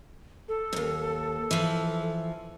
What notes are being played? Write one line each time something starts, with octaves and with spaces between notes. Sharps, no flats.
A4
D#2 G#2
E3 F3